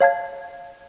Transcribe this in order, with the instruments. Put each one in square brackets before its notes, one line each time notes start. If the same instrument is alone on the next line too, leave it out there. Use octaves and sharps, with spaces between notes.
[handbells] C#5 F5 A5 G#6